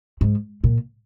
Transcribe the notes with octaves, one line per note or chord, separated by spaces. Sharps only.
G#2
A#2